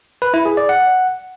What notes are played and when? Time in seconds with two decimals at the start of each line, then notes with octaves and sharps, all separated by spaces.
0.22 B4
0.34 E4
0.45 G#4
0.57 D5
0.69 F#5